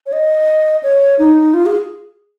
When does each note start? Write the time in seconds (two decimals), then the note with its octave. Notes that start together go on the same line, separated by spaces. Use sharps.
0.06 C#5
0.13 D#5
0.83 C#5
1.19 D#4
1.54 F4
1.66 G#4